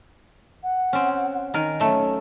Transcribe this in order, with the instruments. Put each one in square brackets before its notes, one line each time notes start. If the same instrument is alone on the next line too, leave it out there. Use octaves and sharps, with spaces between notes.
[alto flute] F#5
[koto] C4 C#4
D#3 A#4 G#5
[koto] F#3 A3 [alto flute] C#4